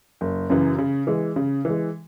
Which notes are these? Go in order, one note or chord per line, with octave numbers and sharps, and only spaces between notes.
F#1
F#2 C#3 E3
C#3
E3 G#3
C#3
E3 G#3